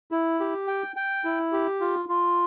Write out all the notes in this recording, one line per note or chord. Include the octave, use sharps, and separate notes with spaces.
E4
G4
G5
G5
E4
G4
F4
F4